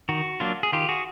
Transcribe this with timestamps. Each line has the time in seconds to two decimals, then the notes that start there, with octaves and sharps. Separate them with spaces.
0.09 D#3 F#4
0.40 F#3 A#3 D4 F4
0.63 G#4
0.73 D#3 F4 G4
0.89 F#4 G#4